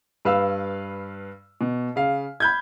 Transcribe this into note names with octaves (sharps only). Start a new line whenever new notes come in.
G2 B4 F5 E6
B2
C#3 F5
B5 G6 G#6